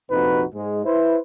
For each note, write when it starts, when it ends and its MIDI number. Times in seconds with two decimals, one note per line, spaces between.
0.10 0.44 34
0.10 0.44 41
0.10 0.44 48
0.10 0.44 63
0.10 0.44 66
0.10 0.44 71
0.53 0.81 44
0.53 0.81 56
0.85 1.18 64
0.85 1.18 71
0.85 1.18 72